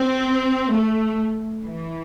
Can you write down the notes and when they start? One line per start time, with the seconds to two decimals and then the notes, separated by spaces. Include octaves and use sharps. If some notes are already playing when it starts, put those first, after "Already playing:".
Already playing: C4
0.72 A3
1.62 E3